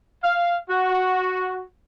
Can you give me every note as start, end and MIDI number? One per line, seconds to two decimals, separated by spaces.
0.23 0.55 77
0.68 1.64 66